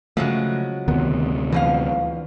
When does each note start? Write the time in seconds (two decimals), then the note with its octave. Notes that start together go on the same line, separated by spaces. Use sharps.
0.17 C#3 F3 F#3 G#3 A3
0.88 D2 C3 D#3 B3
1.52 B2 E3 F3 F5